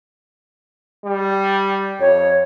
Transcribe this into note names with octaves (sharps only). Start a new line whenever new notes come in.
G3
F2 C#5